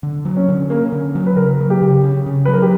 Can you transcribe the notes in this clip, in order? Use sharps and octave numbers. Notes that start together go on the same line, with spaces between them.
D3
F#3
C#4
D3
A#3 C#4
D3
F#3
B4
C#3 A#4
F#3
G4
C#3
C#4
C#3
F#3 B4
A#4
G4